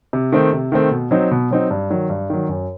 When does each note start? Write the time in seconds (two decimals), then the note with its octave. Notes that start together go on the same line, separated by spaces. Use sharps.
0.13 C3
0.32 D#3 A3 C4
0.53 C3
0.72 D#3 A3 C4
0.91 B2
1.11 F#3 C4 D#4
1.31 B2
1.51 F#3 C4 D#4
1.71 G2
1.90 D#3 F#3
2.10 G2
2.30 D#3 F#3
2.49 F#2